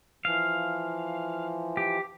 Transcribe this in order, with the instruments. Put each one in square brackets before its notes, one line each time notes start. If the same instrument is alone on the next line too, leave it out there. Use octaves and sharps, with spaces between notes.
[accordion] E3 F3 [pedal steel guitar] F5
[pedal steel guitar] G4